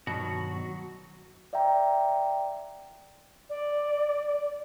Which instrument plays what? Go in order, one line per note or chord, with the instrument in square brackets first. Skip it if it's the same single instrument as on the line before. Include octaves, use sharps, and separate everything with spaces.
[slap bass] G2 D#3 [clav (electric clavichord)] B2 [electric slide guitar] F#3 F#4
[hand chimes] D5 E5 F#5 G5 A#5
[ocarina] D5